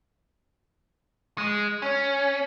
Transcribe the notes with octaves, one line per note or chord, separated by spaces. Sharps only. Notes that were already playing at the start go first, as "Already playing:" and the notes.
G#3
C#4